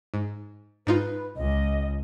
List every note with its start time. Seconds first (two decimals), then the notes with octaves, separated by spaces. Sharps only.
0.14 G#2
0.87 G#2 D#4 F4 B4
1.36 C#2 D#5